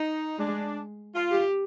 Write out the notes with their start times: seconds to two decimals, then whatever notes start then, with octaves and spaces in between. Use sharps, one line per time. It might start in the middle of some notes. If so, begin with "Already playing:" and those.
Already playing: D#4
0.39 G#3 D4
1.15 F4
1.31 G4